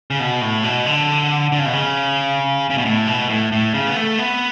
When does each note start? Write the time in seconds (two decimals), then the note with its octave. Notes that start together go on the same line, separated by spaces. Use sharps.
0.11 C#3
0.20 B2
0.41 A2
0.64 B2
0.86 D3
1.52 D3
1.59 C#3
1.66 B2
1.73 C#3
2.70 C#3
2.78 B2
2.85 A2
3.07 B2
3.29 A2
3.52 A2
3.74 C#3
3.87 B3
3.96 A3
4.18 B3